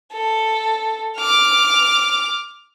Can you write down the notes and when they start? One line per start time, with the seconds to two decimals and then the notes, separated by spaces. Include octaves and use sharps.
0.13 A4
1.18 D6 F6